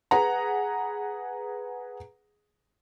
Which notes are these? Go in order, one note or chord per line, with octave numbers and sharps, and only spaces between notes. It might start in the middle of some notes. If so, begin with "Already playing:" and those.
G#4 B4 F#5 A#5